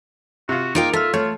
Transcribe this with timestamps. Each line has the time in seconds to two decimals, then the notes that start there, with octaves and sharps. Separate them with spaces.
0.49 C3 F4 F#4
0.75 A#3 D#4 F4 A#4 G5 D6
0.93 F4 A4 E5 F6
1.14 A3 F4 C#5